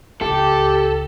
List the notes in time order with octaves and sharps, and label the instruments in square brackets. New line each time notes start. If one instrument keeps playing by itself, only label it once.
[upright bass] D1 C#2 [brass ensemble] G4 [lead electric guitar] A4